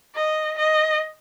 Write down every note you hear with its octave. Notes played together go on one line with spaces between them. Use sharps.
D#5
D#5